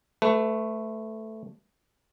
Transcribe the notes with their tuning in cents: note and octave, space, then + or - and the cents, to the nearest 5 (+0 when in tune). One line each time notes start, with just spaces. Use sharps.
A3 +0 B4 +30